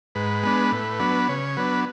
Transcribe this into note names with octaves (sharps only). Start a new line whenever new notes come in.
G#2 B4
G#3 B3 D4
A2
F#3 B3 D4
C#3 C#5
F#3 B3 D4 B4